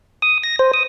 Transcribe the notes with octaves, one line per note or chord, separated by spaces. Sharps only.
D#6
A#6
C5
D#6